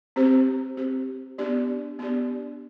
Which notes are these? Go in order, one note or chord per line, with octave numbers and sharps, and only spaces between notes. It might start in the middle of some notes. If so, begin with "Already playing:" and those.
C4 G4 C5
C4 G4 C5
B3 D4 G4 D5
B3 D4 G4 D5